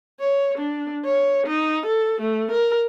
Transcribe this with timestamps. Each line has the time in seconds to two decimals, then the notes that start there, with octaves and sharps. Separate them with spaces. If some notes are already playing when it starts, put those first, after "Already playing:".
0.20 C#5
0.58 D4
1.05 C#5
1.47 D#4
1.86 A4
2.21 A3
2.52 A#4